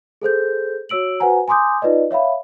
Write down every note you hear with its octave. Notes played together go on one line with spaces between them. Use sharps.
G#4 A4 C5 G6
F#4 C#5 E6 D7 F#7
F#4 B4 C5 F#5 G#5 A#5
G#5 A#5 C6 D6 D#6 G6
D#4 F4 B4 D5 D#5
C#5 E5 F5 B5